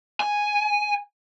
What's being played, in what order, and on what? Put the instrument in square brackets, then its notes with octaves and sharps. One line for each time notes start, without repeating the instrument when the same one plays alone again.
[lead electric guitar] G#5